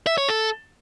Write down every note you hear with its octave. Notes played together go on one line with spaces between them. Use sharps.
E5
C#5
A4